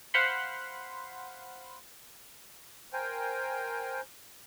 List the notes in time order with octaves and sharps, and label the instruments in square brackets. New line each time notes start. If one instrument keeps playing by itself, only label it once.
[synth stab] C5 F5 F#5 B5 C6
[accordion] A#4 C5 G5 G#5